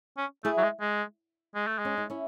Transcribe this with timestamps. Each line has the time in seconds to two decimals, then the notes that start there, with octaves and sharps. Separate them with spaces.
0.17 C#4
0.44 A3 E4 G#4
0.58 F#3
0.63 G#3
0.81 G#3
1.55 G#3
1.67 A3
1.78 G#3
1.85 C#4
1.98 D#4
2.10 C#4 E4